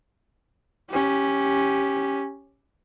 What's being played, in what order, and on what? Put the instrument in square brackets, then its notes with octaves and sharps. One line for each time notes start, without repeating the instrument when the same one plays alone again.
[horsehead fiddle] C#4 G4